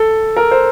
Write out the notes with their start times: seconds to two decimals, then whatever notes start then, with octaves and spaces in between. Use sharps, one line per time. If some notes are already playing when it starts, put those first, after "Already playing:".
Already playing: A4
0.37 A#4
0.51 C5